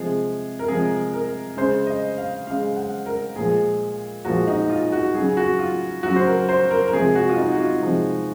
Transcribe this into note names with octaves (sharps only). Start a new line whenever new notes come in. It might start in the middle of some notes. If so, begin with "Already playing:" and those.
Already playing: C3 F3 G#3 G#4
A#4
C3 F3 G#3 G#4
A#4
C#3 G#3 C5
D#5
F5
C#3 G#3 F5
F#5
A#4
A#2 F3 G#3 G#4
A#2 F3 G#3 F#4
D#4
F4
F#4
C#3 F#3 G#4
F#4
F4
C#3 F#3 F#4
C5
A#4
C5
A#4
A#4
C3 F3 G#3 G#4
F#4
F4
D#4
F#4
F4
C3 F3 G#3